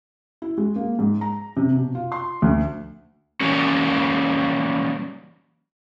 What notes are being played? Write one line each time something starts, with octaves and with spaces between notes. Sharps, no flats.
E4
G#3
A#3
G#2
A#5
C3
B2
F4
C6
D2
E3 F#3 G3 A#3 C#4